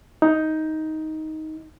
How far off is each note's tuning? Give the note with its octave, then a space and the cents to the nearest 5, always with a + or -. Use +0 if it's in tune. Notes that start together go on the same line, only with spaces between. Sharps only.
D#4 +10